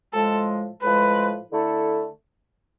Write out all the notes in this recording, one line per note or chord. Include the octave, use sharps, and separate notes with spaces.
A2 F3 G#3 A4
A2 F3 G#3 B4
D3 A3 E4 A4